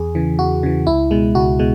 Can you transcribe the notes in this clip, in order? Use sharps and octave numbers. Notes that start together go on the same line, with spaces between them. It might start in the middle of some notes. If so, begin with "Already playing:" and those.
Already playing: E2 G#4
C#3 E3
E2 F#4
C#3 E3
C#2 E4
B2 G#3
C#2 F#4
B2 G#3